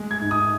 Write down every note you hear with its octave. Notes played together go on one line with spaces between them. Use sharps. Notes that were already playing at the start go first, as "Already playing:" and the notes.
Already playing: G#3
G#6
G#2
D#6